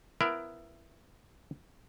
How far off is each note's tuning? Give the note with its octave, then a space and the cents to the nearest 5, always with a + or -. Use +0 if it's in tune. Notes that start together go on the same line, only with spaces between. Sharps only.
B3 +25 E4 +20 A#4 +20